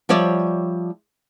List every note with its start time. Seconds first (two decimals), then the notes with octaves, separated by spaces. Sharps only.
0.09 F3 G3 C#5 D5 E5